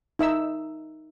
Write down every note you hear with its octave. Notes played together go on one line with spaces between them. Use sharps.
D#4 E5 E6